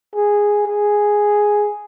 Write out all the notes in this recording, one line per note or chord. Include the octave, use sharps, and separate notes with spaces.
G#4
G#4